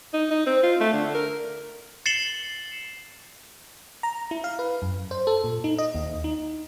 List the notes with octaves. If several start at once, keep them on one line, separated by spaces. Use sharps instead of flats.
D#4
D#4
C4
F4
A3
D3
A#4
A6 C7 C#7 E7 F#7 G7
A#5
E4
F5
B4
F#2
C5
A4
A#2
D#4
D#5
D#2
D#4